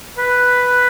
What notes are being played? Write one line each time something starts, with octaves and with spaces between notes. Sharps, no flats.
B4